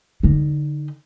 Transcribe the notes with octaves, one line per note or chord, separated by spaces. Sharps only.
D3 D#4